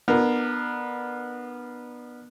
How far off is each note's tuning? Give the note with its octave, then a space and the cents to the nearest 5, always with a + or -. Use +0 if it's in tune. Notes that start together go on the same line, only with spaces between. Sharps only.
B3 -15 D4 +35 A#4 -10